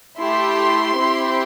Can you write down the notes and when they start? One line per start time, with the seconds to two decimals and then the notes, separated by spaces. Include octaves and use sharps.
0.19 A3 E4 G4 C6
0.97 C4 E4 G4